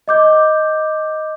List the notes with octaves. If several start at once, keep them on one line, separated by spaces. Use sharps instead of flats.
D#5 D6 G6